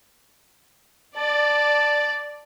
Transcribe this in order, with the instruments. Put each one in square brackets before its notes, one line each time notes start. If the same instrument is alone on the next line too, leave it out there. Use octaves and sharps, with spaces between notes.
[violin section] D5 [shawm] A5